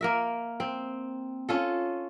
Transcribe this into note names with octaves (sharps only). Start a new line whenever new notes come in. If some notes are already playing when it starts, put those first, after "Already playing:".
A#3 A#4 E5
C4
C#4 F4 A4